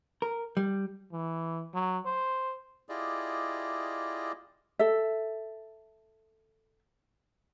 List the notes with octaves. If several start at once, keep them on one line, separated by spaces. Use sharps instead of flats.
A#4
G3
E3
F#3
C5
E4 F4 G4 G#4 D5 D#5
A4 E5